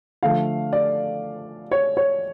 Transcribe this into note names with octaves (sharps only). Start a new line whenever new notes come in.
D3 F3 A3 F5
D5
C#5
C#5